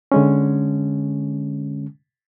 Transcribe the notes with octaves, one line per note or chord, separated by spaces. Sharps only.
D3 G#3 C#4